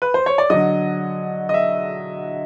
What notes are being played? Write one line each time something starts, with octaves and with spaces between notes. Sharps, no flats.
B4
C5
C#5
D5
D3 F#3 D#5
D#5
E5